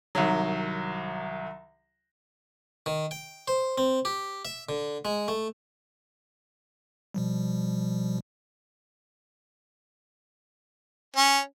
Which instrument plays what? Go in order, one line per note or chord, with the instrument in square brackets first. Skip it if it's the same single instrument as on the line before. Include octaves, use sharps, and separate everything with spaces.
[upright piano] C2 D#3 F#3
[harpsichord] D#3
G5
C5
C4
G4
E5
D3
G#3
A3
[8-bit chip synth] B2 F3 G3
[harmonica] C#4